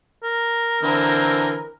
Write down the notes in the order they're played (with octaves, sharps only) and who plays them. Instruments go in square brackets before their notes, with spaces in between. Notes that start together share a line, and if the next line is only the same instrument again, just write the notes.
[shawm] A#4
[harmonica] D3 E3 C4